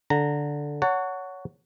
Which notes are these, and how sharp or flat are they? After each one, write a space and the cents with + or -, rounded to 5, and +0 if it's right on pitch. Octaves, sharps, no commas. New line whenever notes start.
D3 -5 A#5 -15
C#5 +15 F#5 +0 A5 +40